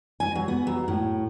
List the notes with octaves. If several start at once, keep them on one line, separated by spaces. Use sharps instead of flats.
G#5
F#3
B3
F#3
A2